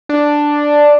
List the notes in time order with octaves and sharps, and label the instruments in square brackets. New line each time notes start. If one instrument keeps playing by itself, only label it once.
[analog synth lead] D4